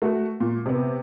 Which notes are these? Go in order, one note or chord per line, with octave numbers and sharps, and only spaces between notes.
A3 F#4
A#2
C3 B3